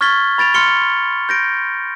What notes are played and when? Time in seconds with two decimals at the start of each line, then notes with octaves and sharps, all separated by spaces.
0.01 C#6 F6 G#6 A6 B6 G7
0.38 B5 A6 D7 F7
0.54 C6 F6 C#7 G7
1.29 G6 A#6 D7